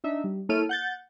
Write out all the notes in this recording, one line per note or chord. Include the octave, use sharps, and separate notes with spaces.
D4 D#4 E5
G3
A#3 E4 A4 C#5 F6 D#7
F#5 G6 A6